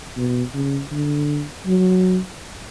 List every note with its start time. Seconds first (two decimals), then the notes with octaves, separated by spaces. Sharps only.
0.17 B2
0.54 C#3
0.91 D3
1.67 F#3